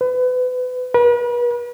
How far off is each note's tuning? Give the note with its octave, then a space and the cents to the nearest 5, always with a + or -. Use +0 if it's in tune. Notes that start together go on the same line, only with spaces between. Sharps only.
B4 +30
B4 -40